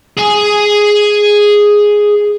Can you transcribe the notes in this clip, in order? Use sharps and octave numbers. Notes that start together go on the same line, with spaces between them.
G#4 G#5